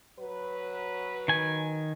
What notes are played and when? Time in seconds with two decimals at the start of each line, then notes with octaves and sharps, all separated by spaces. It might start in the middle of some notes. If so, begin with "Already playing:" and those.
0.19 F#3 B4
1.28 D#3 G#5